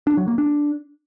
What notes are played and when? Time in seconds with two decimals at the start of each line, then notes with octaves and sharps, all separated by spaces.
0.07 D4
0.17 F#3
0.28 A#3
0.38 D4